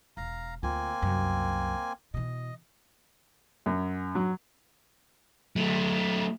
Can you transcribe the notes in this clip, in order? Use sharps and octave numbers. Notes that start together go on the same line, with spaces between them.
E1 F5 A#5
D2 A#3 C4 F4 G#5
C2 F#2
B2 E3 D#5
F#2
F#3
F#3 A3